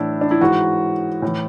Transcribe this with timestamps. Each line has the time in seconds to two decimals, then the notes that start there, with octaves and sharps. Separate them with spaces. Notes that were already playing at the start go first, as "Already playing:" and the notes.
Already playing: A2 E3 D4 E4
0.21 D4
0.31 E4
0.41 G#2 E3 F#4
1.22 A2 E3